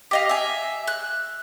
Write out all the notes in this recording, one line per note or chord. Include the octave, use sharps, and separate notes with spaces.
G4 D#5 F5
E5 G#5
F#6